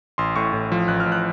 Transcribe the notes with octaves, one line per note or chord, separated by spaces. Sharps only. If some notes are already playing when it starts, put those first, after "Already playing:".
A1 C6
A2 C#6
A2
F3
A1 F#6
F6
A1
F#6